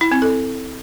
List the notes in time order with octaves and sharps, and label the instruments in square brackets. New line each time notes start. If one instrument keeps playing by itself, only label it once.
[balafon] E4
C4
A4